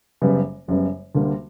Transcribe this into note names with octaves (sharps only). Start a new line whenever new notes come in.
F#1 F#2 C#3 G3 B3
F#1 F#2 C#3 G3 B3
D2 D3 G3 A#3